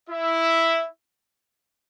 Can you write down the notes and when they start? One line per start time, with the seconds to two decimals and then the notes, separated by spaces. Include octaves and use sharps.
0.09 E4 E5